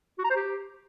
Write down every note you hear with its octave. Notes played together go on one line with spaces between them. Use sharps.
F#4
A#5
C5
G4